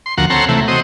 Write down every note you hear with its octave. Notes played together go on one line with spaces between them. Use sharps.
C6
D2 F3 F#4 A#4 F#5
C4 A4 C#5 F#5 A#5 C6
C3 E3 A3
C4 F#4 C5 D#5